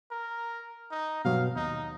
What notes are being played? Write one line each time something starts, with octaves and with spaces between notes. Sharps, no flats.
A#4
D#4
G2 B2 F#3 F5
D#2 D#4